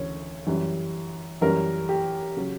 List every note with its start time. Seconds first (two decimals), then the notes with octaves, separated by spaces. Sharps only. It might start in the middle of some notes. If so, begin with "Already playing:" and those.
Already playing: D2 C#3 E3 C#5
0.47 F#2 E3 G3
1.41 F#2 E3 G3 A#4
1.89 G4
2.37 C#3 F#3